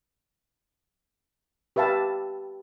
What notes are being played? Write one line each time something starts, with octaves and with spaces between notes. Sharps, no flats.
G4 B4 E5 F5 A5